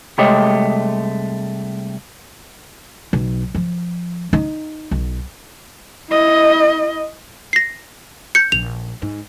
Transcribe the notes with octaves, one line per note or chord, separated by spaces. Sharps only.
C2 G#3 A3 G4 C#5 D#5
B1
F3
D#4
B1
E4 D#5
A#6 C7
G6 C#7
A#1 F7
G#2